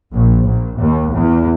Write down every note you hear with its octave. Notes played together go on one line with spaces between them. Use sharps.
A#1
A#1
D#2
E2